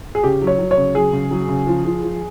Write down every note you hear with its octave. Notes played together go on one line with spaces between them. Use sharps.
G#4
C#3 G4
F#3
C#5
F#3
C#5
C#3
F#3 G#4
C#3
F#3
C#3
F3
F3
F3